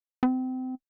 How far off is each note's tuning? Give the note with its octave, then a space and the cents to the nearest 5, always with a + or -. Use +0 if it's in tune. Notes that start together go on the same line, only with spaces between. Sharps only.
C4 -30